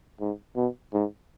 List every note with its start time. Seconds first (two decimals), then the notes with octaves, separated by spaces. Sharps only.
0.20 G#2
0.56 B2
0.93 G#2